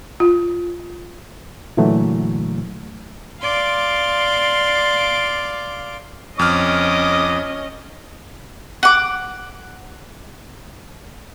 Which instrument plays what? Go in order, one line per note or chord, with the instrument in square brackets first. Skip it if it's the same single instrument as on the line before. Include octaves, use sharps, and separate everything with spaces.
[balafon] F4
[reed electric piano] A#2 D3 E3 F#3 A3
[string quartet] D5 F5 C6 D6
[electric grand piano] F2 F6 [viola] C#4 D#5 [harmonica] D6 D#6
[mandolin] F#5 D6